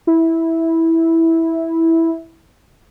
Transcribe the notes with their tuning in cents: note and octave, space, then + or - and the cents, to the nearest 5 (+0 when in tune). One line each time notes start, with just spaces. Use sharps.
E4 -10